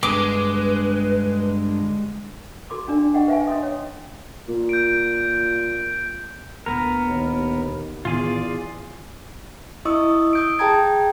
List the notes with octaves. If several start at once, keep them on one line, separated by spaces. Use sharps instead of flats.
G2 D3 G#3 B4 D6
F#4 A4 C6 D6
C#4 D4 D5
G4 D#5 F#5 G5
B4 E5 F5 G5 G#5
C#4 D#5 C6 D#6
C#5
A#2
G6 D7
D2 A#2 B3 A#4
D#2
E2 A2 D#3 B3 F4 G#4 D5
E4 D#5 C#6 D#6 E6
D#6 G6 D7
G#4 G5 A5 A#5 G#6